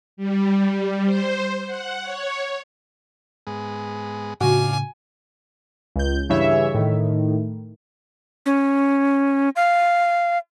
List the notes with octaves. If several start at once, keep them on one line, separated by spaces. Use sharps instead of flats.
G3
C5
F#5
C#5
G#2 G#3 B3
A2 C#3 D4 F4 F#4 G#5
C#2 G6
G2 C#3 E3 C#5 E5
A2 D#3
C#4
F5